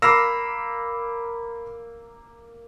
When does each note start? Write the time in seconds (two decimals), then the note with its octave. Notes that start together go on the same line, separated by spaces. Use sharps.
0.02 A#3 B5 D6 E6 F6 A#6 C7